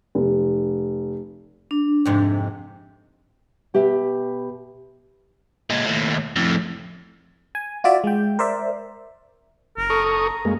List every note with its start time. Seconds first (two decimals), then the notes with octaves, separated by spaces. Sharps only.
0.15 F1
1.71 D4
2.05 F2 G#2 C3
3.74 B2 G4 B4 E5
5.70 A#2 G#3
5.85 D#2 A2
6.36 F2 A2
7.55 G#5
7.84 F4 F#4 D5 E5
8.04 G#3 G5
8.39 A#4 C5 D5 E5
9.77 F#1 A#4
9.90 A4 C#6 D#6
10.05 A#5
10.45 F#2 G#3 A#3